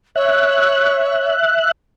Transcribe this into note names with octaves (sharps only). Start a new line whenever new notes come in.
C#5 E5 F#6